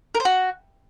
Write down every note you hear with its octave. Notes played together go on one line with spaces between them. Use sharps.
A#4
C5
F#4